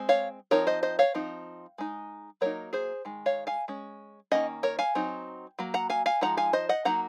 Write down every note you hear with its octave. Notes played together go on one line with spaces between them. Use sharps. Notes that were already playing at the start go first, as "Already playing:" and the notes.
Already playing: G#3 C4
C#5 F5
F3 C4 D#4 A#4 C#5
C5 D#5
C5 D#5
C#5 F5
F3 C4 D#4
G#3 D#4
F#3 A#3 D#4 A#4 C#5
G#4 C5
D#3 G#3
C#5 F5
F5 G#5
G#3 C#4
D#3 A#3 C#4 D#5 F#5
A#4 C#5
F5 G#5
F#3 C4 D#4
F#3 A#3
F#5 A#5
F5 G#5
F5 G#5
F3 G#3 D#4 F#5 A#5
F5 G#5
C5 D#5
D#5 F#5
F#3 A#3 D#4 F#5 A#5